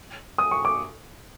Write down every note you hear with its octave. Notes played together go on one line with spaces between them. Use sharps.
D#6
C#6
D6